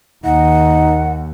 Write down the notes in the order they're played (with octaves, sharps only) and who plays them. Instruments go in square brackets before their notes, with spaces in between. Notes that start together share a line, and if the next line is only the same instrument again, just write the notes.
[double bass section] D#2 [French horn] D#4 [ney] F#5